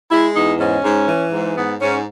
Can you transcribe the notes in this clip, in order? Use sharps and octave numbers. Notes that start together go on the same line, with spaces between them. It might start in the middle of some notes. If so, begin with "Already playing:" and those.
G#3 E4
E2 D#4
G#2 C#4
G#2
E3
G#2
G#2 B3
G#2 C#4